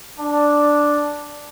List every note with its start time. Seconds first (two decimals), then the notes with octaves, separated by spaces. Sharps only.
0.18 D4